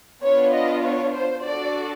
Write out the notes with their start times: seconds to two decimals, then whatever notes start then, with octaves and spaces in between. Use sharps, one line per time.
0.24 B3 D4 F4 C#5
0.54 D#5
0.85 C#5
1.15 C5
1.44 D4 F#4 A4 D5